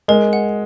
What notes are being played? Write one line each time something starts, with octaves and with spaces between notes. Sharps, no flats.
G#3 A#4
F#5